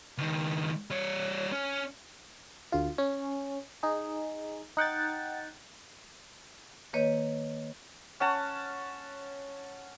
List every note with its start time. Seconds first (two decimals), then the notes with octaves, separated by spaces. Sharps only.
0.18 C#2 D#3
0.90 G3 C#5
1.52 C#4
2.72 D2 F4
2.98 C#4
3.83 D#4 G#4
4.77 D#4 F#5 G5 A6
6.93 D#3 A#3 B4 C#5 D#5
8.20 C#4 F#5 A5